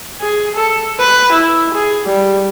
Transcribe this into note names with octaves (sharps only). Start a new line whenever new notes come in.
G#4
A4
B4
E4
G#4
G3